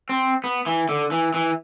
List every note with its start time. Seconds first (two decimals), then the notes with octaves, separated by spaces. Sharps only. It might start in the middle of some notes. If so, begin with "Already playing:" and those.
0.09 C4
0.44 B3
0.67 E3
0.89 D3
1.12 E3
1.34 E3